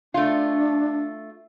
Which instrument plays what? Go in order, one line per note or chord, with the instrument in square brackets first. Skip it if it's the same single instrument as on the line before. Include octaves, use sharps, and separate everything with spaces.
[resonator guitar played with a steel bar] A3 F4 [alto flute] D4